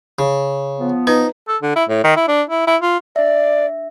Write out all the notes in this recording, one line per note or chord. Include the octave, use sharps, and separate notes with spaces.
C#3
F3 B3
D#4 B4
A4
D3
E4
A2
D#3
E4
D4
E4
E4
F4
D4 D5 E5